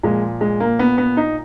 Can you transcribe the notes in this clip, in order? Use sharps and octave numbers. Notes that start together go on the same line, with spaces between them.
A#2 F3 G#3
G#3
A#3
B3
B3
D#4